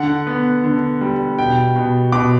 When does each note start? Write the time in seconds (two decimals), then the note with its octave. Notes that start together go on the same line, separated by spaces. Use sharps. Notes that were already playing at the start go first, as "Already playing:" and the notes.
Already playing: D3 F#5
0.27 B3
0.64 D3
1.01 G3
1.38 B2 G5
1.76 B2
2.12 B2 D6